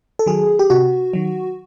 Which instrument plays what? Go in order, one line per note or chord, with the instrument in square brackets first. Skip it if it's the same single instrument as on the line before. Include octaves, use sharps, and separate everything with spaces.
[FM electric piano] A4
D#3 F#3 G#4
G4
C3 F#4
D#3 F#3